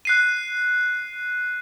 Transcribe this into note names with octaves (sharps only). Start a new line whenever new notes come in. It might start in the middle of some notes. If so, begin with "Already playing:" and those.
F#6 C7 D#7